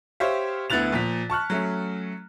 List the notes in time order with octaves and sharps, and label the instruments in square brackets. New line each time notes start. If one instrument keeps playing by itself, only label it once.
[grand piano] G4 C5 C#5 E5 F5
D2 B3 E4 F#6 A6 F7
A#2 F3 B6
A5 C#6 F6 F#6
F#3 A3 C#4